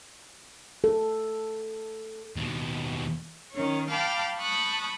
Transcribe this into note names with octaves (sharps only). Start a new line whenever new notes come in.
A4
D#2 B2
D#3 C#4 C#5
F5 G5 A5 B5 D6 F6
A5 B5 C#6 D#6 F#6 G6